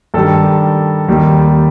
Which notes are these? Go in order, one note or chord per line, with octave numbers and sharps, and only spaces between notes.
G2 D#3 G3 A4
D#2 D#3 G3